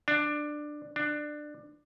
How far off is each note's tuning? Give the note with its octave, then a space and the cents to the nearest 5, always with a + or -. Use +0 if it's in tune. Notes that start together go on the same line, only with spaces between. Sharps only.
D4 +15
D4 +20